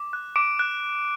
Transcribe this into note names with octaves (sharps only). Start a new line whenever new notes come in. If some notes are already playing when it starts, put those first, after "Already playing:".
Already playing: D6
F#6
D6 D7
F#6